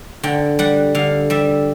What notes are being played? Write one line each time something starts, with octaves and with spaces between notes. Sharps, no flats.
D3 G5
G3 F#5
D3 F5
G3 E5